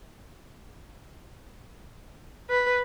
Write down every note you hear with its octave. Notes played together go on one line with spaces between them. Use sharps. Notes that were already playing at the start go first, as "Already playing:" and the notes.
B4